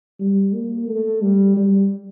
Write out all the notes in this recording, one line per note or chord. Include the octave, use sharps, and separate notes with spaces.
G3
A#3
A3
G3
G3